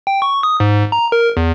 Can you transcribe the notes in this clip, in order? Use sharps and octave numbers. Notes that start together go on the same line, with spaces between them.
G5
C#6
D#6
G#2
A#5
A#4
E2